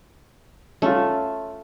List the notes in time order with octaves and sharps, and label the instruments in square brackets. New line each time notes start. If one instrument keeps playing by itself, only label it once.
[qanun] A3 [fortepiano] C#4 F4